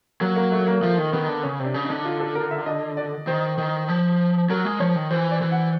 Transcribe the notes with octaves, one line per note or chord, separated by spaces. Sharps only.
F#3 A#3
A#3
A3
A#3
F3 A3
D#3
D#3 B3
D3
C#3 C#4
C3
D4
C#3
D#4
D3
F4
A4
A#4
E5
D#5
D5
D#3 C5
D#3
F3
F#3 A#4
G#3
F3 C#5
D#3
E3 C5
D5
E3
F#5